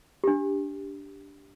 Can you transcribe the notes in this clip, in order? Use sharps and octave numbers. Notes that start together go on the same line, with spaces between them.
D4 G4